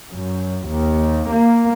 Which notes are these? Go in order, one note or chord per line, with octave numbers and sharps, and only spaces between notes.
F#2
D#2
A#3